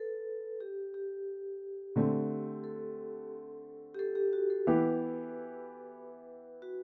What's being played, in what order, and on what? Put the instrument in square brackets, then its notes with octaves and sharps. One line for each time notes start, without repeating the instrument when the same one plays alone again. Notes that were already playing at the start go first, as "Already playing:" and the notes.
Already playing: [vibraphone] A4 B4
G4
G4
[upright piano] D3 A3 C4
[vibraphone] A4
G4
A4
G4
F#4
A4
[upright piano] E3 B3 E4 G4 [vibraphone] B4
[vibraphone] F#4